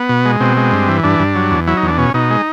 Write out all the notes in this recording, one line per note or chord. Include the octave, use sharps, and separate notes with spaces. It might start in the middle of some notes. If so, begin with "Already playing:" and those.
Already playing: B3
B2
G#3
B2 C4
G#3
G2
E3
G2 D4
G2
F#3
E2
F#3 E4
D#4
E2
D4
B2 C#4
B2 D#4
G#3